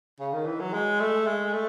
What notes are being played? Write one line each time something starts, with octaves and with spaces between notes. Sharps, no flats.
C#3
D#3
E3
F#3
G#3
A3
G#3
A3